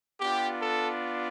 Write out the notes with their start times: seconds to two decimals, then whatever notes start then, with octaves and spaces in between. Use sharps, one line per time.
0.20 B3 D4 F4 G4
0.60 A4